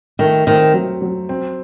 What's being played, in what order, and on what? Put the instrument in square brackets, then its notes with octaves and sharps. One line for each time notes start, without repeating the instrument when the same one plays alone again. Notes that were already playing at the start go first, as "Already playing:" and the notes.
[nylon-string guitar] D#3 [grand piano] A3
[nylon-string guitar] D#3 [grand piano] C4
[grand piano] F#3
F#3
C4